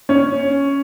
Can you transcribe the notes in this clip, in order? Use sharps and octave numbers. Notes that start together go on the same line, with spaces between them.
C#4